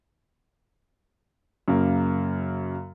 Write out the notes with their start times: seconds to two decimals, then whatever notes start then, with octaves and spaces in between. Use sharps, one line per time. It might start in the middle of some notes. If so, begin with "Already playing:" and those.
1.68 F#2 C#3 A#3